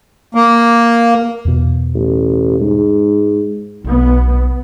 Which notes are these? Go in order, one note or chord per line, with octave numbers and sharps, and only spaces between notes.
A#3
E2 B2
A1
G#2
B1 B2 B3